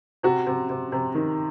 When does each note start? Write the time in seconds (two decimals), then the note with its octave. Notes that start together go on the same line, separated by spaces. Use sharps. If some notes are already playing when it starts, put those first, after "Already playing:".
0.23 C3 F#4
0.47 C3
0.69 C3
0.92 C3
1.15 D#3